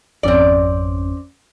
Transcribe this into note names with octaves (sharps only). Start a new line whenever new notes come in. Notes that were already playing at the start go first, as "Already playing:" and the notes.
G#1 F2 C4 C#4 D5